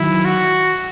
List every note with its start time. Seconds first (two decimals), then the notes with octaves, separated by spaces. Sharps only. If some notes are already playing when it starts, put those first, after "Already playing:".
Already playing: D#3 F#3 E4
0.25 F#4